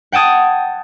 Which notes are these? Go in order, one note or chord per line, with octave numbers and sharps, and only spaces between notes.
F#5 G5 A5 D#6 G#6